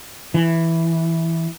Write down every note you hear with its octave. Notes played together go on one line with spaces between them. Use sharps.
E3